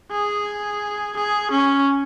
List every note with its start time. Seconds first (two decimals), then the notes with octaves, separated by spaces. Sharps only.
0.11 G#4
1.17 G#4
1.51 C#4